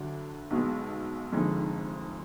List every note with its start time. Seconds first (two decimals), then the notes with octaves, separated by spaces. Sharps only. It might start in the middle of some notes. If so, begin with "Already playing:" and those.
Already playing: D2 D3 F#3 D4
0.50 B1 B2 G#3
1.32 F1 F2 D3 G#3 D#4